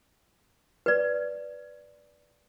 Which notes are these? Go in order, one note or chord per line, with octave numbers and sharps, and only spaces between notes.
B4 D5